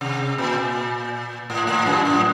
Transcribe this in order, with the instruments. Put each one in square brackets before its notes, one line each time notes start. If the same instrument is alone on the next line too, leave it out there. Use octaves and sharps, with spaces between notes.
[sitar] C3
A#2
A2
A2
F#2
A2